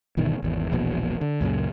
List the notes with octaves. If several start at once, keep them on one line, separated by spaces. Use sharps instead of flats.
G1 B2 D#3 E3
G#1 E2
E1 A#1 B2
D3
C#2 F#2 A#2 C#3